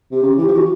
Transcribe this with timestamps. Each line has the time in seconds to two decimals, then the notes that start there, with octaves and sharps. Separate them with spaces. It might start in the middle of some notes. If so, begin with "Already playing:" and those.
0.11 C3 G4
0.22 C#3
0.37 E3 G4
0.47 F3
0.53 E3 F#4